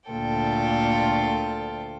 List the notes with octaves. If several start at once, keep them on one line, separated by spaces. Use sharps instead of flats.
D2 A#2 F4 A4 G5